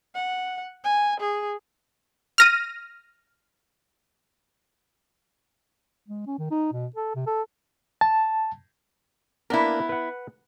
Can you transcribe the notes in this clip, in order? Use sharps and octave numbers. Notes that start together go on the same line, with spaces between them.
F#5
G#5
G#4
F6 A#6 D#7
G#3
C#4
D#3
D#4
B2
A4
C3
A4
A5
A#3 B3 D4 E4 A#4
B4 F#5